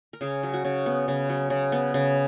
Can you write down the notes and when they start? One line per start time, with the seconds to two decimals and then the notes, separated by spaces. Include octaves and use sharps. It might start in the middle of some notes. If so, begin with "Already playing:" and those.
0.13 A#4
0.21 C#3 G#4
0.43 F#3
0.54 F#4
0.65 C#3
0.86 B3
1.08 C#3
1.29 F#3
1.50 C#3
1.72 B3
1.94 C#3